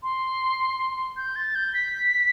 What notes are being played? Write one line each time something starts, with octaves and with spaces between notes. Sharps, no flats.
C6
G6
A6
G6
B6